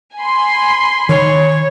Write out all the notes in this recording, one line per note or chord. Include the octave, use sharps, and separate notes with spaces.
G#5 B5 C6
D#3 C#5